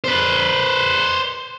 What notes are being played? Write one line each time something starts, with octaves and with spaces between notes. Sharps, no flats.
B4 C5